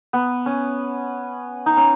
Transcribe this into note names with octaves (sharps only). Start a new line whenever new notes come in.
B3
C#4
D#4
C#4